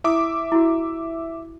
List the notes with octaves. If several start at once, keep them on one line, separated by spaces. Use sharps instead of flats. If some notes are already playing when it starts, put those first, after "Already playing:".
E4 E5 D6 D#6
E4 F#4